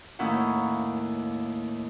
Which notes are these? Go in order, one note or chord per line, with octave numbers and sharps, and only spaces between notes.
D#2 A2 A#3 C#4 E4 F#5